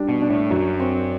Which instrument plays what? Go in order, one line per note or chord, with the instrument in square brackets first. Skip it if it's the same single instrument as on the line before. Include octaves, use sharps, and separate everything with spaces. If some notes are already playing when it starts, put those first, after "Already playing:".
Already playing: [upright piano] G3 D4
[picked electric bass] B2
[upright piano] D4
[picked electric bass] A2
[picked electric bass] F#2 [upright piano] F#3
[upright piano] C4